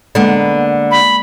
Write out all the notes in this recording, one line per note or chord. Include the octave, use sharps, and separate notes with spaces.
D3 G#3 A#3 B3
B5